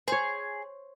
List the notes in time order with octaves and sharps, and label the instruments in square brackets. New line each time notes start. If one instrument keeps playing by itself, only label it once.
[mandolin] G#4 [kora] C5 C#5